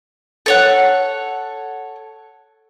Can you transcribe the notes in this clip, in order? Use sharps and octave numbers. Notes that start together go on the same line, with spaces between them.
A4 C#5 F#5